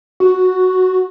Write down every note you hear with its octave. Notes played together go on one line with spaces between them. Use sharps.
F#4